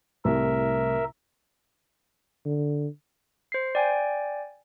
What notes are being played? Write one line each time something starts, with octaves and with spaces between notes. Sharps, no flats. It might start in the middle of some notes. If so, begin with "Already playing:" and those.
C2 A2 C3 A#4 E5
D3
C5 C7
D5 G5 G#5